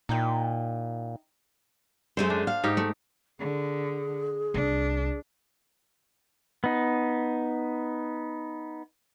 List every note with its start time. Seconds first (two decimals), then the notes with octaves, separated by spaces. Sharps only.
0.09 A#2 D#4 E4 G5
2.17 F#2 G#3 A3 C5
2.30 D4
2.47 F5
2.64 G#2 D#4 G4
2.77 A3
3.40 D3 G#4
4.54 C2 D4
6.64 B3 D#4